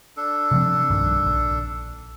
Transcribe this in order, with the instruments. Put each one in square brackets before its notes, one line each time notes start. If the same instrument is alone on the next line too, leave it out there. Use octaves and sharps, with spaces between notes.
[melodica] D4 A4
[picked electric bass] C3 F3 C4
B1 G2 D#3
A#1